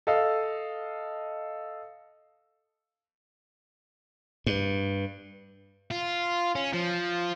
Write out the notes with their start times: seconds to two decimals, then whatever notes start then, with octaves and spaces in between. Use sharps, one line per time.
0.07 A4 D#5 F5
4.46 G2
5.91 F4
6.55 C#4
6.73 F3